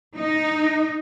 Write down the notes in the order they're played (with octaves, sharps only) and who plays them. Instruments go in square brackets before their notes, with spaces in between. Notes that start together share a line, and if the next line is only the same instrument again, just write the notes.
[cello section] D#4